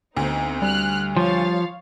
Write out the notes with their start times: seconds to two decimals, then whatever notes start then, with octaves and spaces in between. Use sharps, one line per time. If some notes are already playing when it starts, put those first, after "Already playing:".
0.17 D2 B3 C4 D#4
0.62 G3 F6 F#6
1.17 F3 C#5 F5 A6